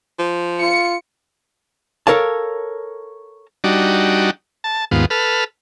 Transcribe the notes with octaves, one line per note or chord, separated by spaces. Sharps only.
F3
F4 C#7
A4 A#4 C#5 F5 A5
G3 D4 D#4 F#4
A5
D#2 G#2 B3 F4
A4 B4 F6